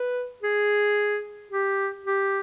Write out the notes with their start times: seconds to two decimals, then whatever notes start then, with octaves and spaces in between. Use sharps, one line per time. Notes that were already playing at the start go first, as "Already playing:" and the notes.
Already playing: B4
0.43 G#4
1.51 G4
2.06 G4